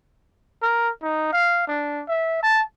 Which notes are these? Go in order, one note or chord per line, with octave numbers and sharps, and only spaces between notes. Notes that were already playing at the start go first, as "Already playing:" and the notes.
A#4
D#4
F5
D4
E5
A5